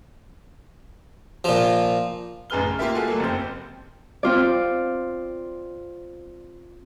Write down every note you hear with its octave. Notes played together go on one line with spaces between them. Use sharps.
A#2 F3
A1 F#2 G#4 B4 F6 G7
C#3
A#3 F4 G4 A#4 E5
G#3 F4 F#4 G#4 A4
F#3 A3 A#3
F#1 F2 C4 G4 G6
C4 F4 D5